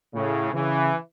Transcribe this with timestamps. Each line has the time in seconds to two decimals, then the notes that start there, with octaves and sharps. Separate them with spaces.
0.14 A2 C#3
0.53 C#3 E3